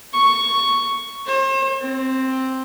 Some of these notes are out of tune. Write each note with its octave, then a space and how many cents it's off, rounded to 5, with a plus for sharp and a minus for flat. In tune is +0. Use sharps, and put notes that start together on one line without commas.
C#6 +5
C5 +40
C4 +5